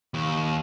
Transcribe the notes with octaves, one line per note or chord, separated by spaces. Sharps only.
D#2